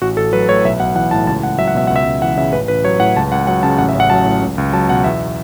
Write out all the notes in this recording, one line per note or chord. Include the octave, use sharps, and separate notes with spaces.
A1 F#4
A1 A4
F#3 B4
A2 C#5
B1 E5
B1 F#5
E3 F#5
A2 A5
C#2 A5
C#2 F#5
F#3 E5
F#5
B2 E5
C#2 F#5
E5
C#2
E3 F#5
C#3 E5
A1 B4
A1 B4
F#3 C#5
A2 F#5
C#2 A5
C#2 F#5
F#3 F#5
C#3 A5
A1 F#5
E5
A1 F#5
F#3 A5
A2
C#2
C#2
F#3 A5
B2 F#5
E2 E5